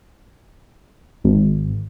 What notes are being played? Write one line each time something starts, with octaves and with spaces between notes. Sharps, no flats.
G#1